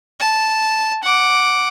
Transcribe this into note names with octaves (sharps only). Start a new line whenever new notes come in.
A5
F#5 D6